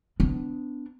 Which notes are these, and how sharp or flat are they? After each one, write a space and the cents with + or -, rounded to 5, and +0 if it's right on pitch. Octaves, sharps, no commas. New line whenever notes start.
B3 +30 D4 -5